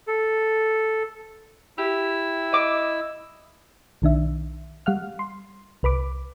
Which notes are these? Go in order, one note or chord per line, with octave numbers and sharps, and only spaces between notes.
A4
E4 G4 E6
D#5 D6
B1 D#3 D4 E5
G3 F5 F#5 F6
C6
C2 B4 B5 D6